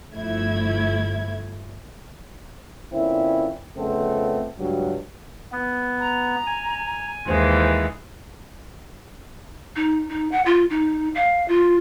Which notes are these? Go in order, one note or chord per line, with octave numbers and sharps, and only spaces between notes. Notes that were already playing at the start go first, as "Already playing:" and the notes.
G1 F3 A3 E4 G#6
A#2 D3 C4 C#4 E4
F2 C#3 A3 B3 C4 A4
C#2 G2 F#3
B3
A#5
G#5
D#2 E3 G#3 C5
D#4
D#4
F#5
F4
D#4
F5
F4